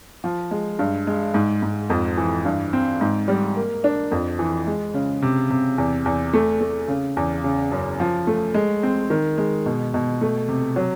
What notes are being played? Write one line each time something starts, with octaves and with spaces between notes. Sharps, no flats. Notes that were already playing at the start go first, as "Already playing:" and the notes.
F3
G#3
G2
G#3
G#2
G#2
F2
E3
G2
C4
G#2
G3
A#3
D4
F2
E3
G#3
C#3
C3
C3
E2
E2
A3
A3
C#3
E2
C#3
F#2
F3
A3
G#3
C4
D#3
G#3
B2
B2
A3
C3
F#3